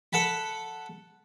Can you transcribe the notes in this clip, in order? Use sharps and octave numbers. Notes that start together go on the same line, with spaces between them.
A4 F#5 A5 B5